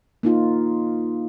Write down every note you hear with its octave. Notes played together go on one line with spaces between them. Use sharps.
A#3 D#4 F4